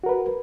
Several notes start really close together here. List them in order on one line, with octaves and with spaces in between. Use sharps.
F#4 A#4 B4